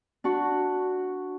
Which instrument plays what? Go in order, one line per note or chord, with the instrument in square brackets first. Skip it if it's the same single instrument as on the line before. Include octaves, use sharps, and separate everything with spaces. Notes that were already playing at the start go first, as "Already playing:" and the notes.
[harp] D4 F#4